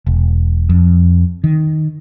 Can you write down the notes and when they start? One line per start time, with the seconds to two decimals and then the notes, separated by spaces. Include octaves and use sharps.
0.07 E1
0.69 F2
1.44 D#3